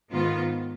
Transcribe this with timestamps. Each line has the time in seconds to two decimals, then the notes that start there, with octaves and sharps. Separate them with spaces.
0.11 G#2 D#3 B3 F4